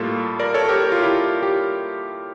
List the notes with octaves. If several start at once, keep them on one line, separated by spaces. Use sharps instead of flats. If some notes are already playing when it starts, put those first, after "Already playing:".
Already playing: A2 G3 A#3 F4 A4
A#4 D5
A4 C#5
G4 A#4
G4
F4
E4 G4
G4